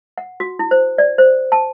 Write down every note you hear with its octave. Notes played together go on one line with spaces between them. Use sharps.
F#5
F#4
E4
C5
D5
C5
A5